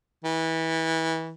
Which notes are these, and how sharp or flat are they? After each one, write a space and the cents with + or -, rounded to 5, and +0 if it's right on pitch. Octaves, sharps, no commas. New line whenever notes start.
E3 -25